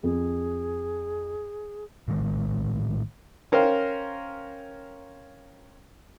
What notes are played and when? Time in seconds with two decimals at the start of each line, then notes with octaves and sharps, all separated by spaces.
0.03 F2 G#4
2.08 A#1 A2 D#3 G#3
3.52 C#4 A#4 C5 F5 G5